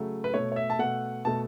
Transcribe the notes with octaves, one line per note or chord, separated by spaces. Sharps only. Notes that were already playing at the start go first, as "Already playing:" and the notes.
Already playing: C#3 F#3 A3
B4
B2 A3 C#5
C#5
E5
A5
B2 A3 F#5
B2 A3 A5